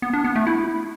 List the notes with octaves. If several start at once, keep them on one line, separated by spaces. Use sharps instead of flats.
B3
D4
B3
A3
E4